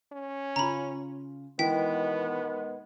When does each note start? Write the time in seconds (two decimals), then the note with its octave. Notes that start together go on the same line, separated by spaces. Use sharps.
0.12 C#4
0.56 C#3 F4 A#5 B5
1.59 B2 D#3 E3 G#3 B3 G5 B6